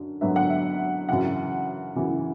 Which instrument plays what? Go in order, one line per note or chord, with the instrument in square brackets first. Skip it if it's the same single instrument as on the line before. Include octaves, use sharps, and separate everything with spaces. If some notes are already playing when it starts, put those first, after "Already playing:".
Already playing: [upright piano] F#2 D3
F#2 D3 F#3 B3 E5
F#5
E5
F#2 C#3 E3 F#5
F#2 C#3 E3